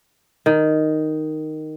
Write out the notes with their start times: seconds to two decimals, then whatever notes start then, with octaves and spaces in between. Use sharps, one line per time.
0.46 D#3